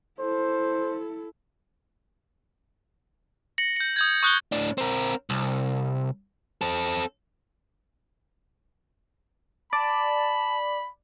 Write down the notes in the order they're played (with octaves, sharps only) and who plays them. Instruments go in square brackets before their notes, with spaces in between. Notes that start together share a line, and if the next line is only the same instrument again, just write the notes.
[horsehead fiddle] E4 A4 [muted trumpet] C5
[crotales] A#6 C#7 F#7
G6 C#7
D#6 G6 G#6
C#6 D#6 F#6 G6 A#6 G7
[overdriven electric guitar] A2 D4
C4 A#4
C2
C4 A4
[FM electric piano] D5 [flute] A5 [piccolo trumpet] B5